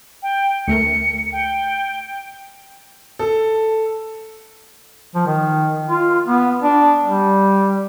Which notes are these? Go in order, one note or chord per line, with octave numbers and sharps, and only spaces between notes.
G5
D2 A3 A#4 C#7
G5
A4
F3
D#3
F4
B3
D4
G3